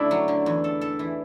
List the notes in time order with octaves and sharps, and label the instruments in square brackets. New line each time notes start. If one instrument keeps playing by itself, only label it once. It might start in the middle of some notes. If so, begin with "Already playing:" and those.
Already playing: [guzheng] D3 A3 [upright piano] D4 E4
[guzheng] F#3
D3
E2
A4
A4
E3